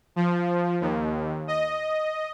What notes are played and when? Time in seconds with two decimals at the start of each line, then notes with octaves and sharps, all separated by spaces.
0.16 F3
0.81 D#2
1.48 D#5